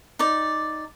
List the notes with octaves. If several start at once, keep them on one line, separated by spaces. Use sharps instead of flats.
D#4 D5